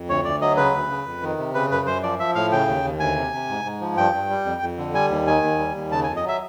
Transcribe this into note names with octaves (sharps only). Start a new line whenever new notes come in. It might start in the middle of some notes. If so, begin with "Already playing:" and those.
Already playing: F2
D2 C#5
D2 D5
F#3 D#5
C#3 B4
D2
C#3
F2
D#3
C3
C#3 B4
F#2 B4
F#2 C5
F3 D5
F3 E5
A2 F5
C#3 G5
D#2
D#2
D2 G#5
C3
C3
G#2
G#2
F3
G2 G5
G2
G3
F2
F2
D3
G3 G#5
D#2
D#3 G#5
D#2
G3
D#2
C#3 A5
G#5
F2
D#5
F#3 E5